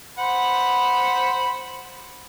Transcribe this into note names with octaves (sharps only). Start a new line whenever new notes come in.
C5 F#5 B5